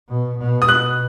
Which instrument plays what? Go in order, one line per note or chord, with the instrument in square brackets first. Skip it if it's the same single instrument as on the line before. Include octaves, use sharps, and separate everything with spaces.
[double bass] B2
B2
[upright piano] D#6
[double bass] B2 [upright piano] F#6